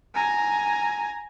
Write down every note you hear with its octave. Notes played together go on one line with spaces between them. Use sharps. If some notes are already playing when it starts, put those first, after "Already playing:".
G#5 A#5